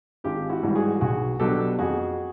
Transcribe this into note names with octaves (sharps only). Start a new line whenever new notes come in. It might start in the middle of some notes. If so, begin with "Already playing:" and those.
G#1 F4 G4
E4 F#4
G#2 E3 G3
F#4 G#4
B1 F#4 G#4
B2 F#3 B3 D4 G4 A4
F2 F#4 G#4